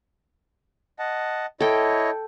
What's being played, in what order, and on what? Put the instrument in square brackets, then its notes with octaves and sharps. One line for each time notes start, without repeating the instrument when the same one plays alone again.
[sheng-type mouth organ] D#5 F#5 A5
[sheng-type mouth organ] E4 C#5 D#5 [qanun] A4 G5